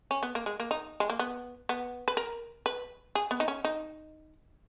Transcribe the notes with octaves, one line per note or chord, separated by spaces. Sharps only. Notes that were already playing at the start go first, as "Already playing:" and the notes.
C#4
B3
A#3
G#3
A#3
D#4
G#3
A#3
B3
B3
B4
A#4
B4
G#4
B3
D#4
C#4
D#4